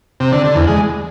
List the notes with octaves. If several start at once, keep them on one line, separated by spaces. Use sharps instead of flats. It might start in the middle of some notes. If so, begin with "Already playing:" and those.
C3
D3
D3
E2
G#3